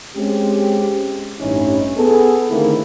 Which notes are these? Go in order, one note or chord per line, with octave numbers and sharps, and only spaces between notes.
G#3 C4 C#4 G4
A1 G2 E3 C#4 D#4 E4
B3 G#4 A4
D3 D#3 A3 A#3 C4 E4